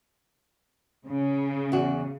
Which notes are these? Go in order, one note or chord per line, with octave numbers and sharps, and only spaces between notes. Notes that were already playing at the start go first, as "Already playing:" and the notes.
C#3
E2 F#4